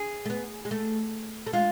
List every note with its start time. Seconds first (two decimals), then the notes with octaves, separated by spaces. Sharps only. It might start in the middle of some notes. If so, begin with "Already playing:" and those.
Already playing: G#4
0.25 A3
0.30 B3
0.65 G#3
0.71 A3
1.47 A3
1.53 G#3 F4